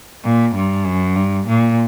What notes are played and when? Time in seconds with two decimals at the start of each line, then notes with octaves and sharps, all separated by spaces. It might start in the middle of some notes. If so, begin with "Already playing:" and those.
0.24 A#2
0.55 G2
0.85 F#2
1.16 G2
1.47 A#2